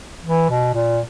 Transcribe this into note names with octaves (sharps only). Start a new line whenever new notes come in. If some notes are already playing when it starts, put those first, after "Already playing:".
E3
B2
A#2